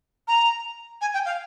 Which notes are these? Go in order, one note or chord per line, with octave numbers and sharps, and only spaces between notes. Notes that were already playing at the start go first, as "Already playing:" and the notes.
A#5
G#5
G5
F5